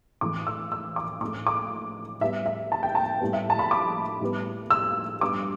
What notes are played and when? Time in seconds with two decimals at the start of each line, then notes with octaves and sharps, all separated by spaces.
0.21 A2 E3 A3 D6
0.47 E6
0.72 E6
0.96 D6
1.21 A2 A3 D6
1.47 D6
2.21 A2 G3 B3 E5
2.46 E5
2.72 A5
2.83 G5
2.95 A5
3.21 A2 G3 B3
3.33 E5
3.50 A5
3.59 B5
3.71 D6
4.21 A2 G3 B3
4.70 E6
5.21 G2 G3 B3 D6